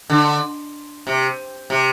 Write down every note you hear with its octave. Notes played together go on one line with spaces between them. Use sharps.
D3
C3
C3